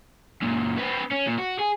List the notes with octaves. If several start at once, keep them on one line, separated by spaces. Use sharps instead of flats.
F#2 A#2
C4 B4
C#4
A#2
F#4
G#4